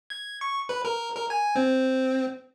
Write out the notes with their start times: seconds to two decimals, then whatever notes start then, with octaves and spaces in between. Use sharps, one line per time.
0.10 G#6
0.41 C#6
0.69 B4
0.85 A#4
1.16 A#4
1.30 G#5
1.55 C4